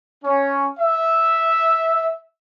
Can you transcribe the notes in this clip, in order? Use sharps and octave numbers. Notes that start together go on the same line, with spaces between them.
C#4
E5